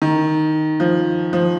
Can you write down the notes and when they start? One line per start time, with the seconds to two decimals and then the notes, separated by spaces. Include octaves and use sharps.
0.02 D#3
0.80 F3
1.33 F3